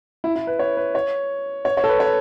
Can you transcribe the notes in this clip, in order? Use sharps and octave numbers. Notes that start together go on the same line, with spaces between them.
E4
E4
B4
C#5
B4
C#5
C#5
C#5
A4
B4
C#5